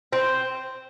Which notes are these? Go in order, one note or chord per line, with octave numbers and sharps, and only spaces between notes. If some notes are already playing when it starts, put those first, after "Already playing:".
C4